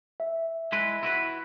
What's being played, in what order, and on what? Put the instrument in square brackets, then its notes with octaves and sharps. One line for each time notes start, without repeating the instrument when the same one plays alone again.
[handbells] E5
[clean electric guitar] G#3 E4 B4
E4 F#4 B4